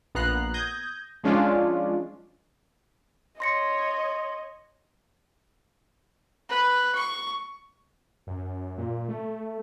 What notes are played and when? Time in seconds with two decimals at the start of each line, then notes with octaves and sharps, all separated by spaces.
0.15 A#1 B3 A#5 F#6 C7
0.54 D#6 G6 G#6 A#6
1.24 F3 G#3 C#4 D4 F4 D5
3.40 C#5 D#5 C6 A#6 C#7
6.49 B4
6.96 C#6
8.27 F#2
8.78 A#2
9.09 A3